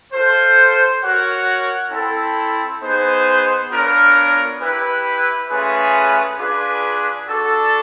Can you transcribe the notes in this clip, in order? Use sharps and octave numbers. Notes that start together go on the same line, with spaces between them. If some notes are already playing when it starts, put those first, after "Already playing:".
F4 A4 C5
F#4 A#4 C#5 F#5
C4 E4 A4
B3 D#4 G#4 C5
B3 D4 F4 A#4 C#5
E4 G4 B4
A3 C#4 F4 G#4 B4
D4 F4 G#4 B4
D4 F#4 A4